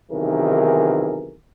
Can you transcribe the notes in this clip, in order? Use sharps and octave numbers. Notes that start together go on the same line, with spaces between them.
B1 C3 D#3 E3 G#4 A#4